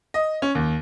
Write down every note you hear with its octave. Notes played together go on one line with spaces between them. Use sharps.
D#5
C#4
D#2